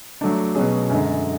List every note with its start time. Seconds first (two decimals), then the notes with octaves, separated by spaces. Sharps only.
0.21 F#3 A3 D4
0.55 B2 F#3 C#4 G#4
0.90 F#2 D3 G#3